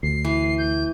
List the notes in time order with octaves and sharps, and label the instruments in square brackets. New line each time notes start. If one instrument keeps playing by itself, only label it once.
[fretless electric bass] D2 [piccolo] C7
[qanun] E3
[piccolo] G6